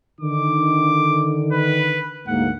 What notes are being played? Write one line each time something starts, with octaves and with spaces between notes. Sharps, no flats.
D3 D#3 D6
B4
D2 G#2 A#3 F#5